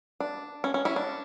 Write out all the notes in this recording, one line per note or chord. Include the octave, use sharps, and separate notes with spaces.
D4
C#4
C#4
C#4 E4
D4